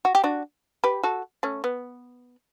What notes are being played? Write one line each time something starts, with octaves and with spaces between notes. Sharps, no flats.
F#4
G4
D4 F#4
G4 B4
F#4 A4
A3 C#4
B3